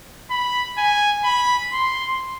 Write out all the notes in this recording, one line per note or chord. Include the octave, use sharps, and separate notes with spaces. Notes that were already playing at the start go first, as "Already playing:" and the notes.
B5
G#5
B5
C6